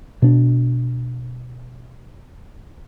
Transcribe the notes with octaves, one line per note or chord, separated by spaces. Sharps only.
B2 D4